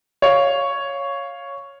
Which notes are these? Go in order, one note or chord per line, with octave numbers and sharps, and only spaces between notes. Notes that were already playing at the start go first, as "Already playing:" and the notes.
C#5 F5 C#6